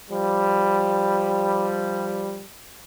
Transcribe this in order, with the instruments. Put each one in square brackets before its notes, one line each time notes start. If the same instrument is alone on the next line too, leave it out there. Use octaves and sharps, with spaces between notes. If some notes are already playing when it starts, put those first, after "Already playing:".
[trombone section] F3 G3